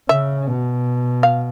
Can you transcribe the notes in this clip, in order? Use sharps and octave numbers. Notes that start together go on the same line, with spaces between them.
C#3 E5
B2
F5